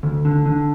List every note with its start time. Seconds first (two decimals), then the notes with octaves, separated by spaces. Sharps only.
0.03 D2
0.25 D3
0.46 D3